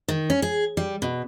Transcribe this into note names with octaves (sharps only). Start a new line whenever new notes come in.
D#3
C#4
G#4
G3
B2